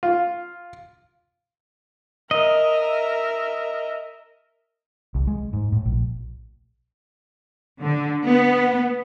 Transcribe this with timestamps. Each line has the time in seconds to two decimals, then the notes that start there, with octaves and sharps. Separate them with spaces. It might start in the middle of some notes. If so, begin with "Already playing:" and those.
0.03 F4
2.31 A#4 D#5 E5
5.15 C2
5.27 G#3
5.53 G#2
5.72 A2
5.86 A#1
7.81 D3
8.25 B3